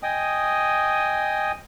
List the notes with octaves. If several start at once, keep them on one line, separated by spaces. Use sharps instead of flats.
D#5 G5 G#5 D#6